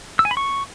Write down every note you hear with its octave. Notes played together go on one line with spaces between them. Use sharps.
E6
G#5
B5
C#6